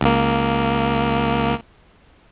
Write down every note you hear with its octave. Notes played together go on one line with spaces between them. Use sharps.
C#2 A#3